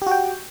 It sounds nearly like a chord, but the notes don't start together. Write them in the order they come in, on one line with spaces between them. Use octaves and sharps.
G4 F#4 G5